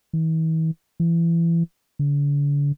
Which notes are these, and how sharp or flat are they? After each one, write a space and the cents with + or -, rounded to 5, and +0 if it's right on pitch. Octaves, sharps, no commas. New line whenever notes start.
E3 -45
E3 +25
D3 -40